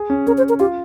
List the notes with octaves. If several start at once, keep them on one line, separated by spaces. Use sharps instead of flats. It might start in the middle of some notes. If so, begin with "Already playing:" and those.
Already playing: G#4
C#4
C#4 A#4
C5
A#4
F4 G4